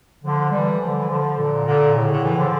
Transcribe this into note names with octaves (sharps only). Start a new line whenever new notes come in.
D3 F3
E3 G3
D3 F3
E3
D3 F3
A#2 D3
A#2 D3
A2 C#3
D3
E3
D3 F3